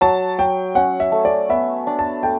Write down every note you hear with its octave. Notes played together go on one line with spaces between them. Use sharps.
F#3 A5
F#3 G5
C#4 F#5
E5
A3
D5
B3 E5
D4
A5
A3 G5